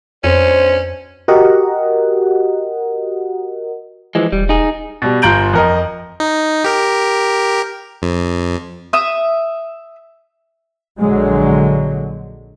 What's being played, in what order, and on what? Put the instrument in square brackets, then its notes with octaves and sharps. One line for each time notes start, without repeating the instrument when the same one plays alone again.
[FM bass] F2 [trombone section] B2 D4 C5 [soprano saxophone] C#4
[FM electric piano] F#4 G4 A#4 D#5 F#5
[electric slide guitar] E3 F3 G#3
[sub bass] E1 [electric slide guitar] G3
[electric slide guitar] D#4 G#4
[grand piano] B2 G3
G1 F4 A#5 G6 D7 F#7
F2 A#4 D#5
[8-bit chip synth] D#4
G4 A#4
F2
[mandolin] E5 D#6
[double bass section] A#1 D3 F#3 G#3